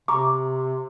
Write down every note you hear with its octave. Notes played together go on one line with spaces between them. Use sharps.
C3 A#5 C#6 D6